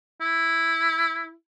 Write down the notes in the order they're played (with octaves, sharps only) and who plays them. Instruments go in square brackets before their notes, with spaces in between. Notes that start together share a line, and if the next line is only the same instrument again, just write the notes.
[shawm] E4